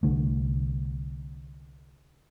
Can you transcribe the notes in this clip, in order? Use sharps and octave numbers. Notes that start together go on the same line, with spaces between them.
C2 D3 A3